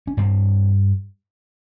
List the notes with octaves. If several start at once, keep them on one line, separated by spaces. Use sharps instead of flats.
C#4
G2 C4